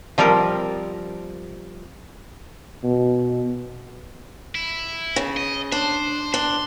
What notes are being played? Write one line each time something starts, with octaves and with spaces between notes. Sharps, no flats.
F3 G3 C4 A#4
B2
E4
C#3
D#5
D4 C5
D4 C6